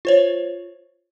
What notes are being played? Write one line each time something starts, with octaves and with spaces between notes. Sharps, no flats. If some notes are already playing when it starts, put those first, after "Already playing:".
F4 C5 C#5